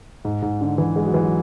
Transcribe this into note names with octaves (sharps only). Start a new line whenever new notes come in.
G#2
G#2
D3
E3
G#3
F#3
E3
F#3